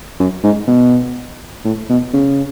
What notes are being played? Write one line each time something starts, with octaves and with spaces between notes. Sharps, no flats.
F#2
G#2
B2
A2
B2
C#3